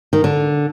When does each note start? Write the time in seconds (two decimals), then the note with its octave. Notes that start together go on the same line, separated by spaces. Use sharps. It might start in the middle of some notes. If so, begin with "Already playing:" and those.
0.13 D#3
0.24 D3